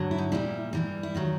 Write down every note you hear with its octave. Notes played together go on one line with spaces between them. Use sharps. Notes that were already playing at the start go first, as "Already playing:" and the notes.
Already playing: G2 D3 F#3
E4
D#4
A#2 G3 E4
G2 E3 G3
E4
D#3 F#3 F4